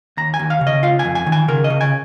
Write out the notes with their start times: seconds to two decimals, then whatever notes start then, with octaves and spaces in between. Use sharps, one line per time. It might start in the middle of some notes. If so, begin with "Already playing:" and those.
0.17 D#2 A#5
0.34 G#5
0.39 D#2
0.50 F5
0.61 C#3
0.67 D#5
0.83 F4 F5
0.99 G#5
1.05 F2
1.15 G#5
1.26 D#3
1.32 G#5
1.48 C#3 A#4
1.64 D#5
1.70 C#3
1.81 G#5